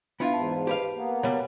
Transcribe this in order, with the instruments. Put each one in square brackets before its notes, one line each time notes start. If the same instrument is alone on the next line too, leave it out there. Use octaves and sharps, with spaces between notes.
[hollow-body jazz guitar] B3 E4 F4 [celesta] D4 F5
[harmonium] E2 G#2 [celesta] A5
[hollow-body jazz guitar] G4 B4 F5
[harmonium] A#3 B3
[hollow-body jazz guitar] B2 G3 [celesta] C#5